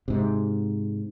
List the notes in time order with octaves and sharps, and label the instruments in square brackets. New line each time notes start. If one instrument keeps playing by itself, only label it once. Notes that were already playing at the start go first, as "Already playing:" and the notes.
[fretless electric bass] G#2 C3